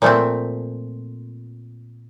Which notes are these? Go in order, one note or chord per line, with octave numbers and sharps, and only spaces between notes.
A#2 F3 A3 C4